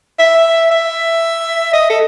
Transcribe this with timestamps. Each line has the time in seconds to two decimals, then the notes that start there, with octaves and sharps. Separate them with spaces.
0.19 E5
0.71 E5
1.73 D#5
1.90 A4